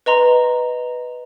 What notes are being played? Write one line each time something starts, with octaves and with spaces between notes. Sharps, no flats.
B4 D#5 A#5 C6